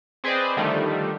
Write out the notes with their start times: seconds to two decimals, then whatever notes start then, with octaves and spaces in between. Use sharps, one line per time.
0.24 C4 G#4 B4 C5 D5 D#5
0.57 D3 D#3 F3 G3 A3